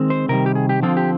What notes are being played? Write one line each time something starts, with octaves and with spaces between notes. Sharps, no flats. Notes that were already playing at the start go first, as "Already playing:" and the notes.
Already playing: D#3 G#3 C4
C5
C3 D#3 G3 A#4
G4
G#4
G4
D3 F3 C4 F4
G4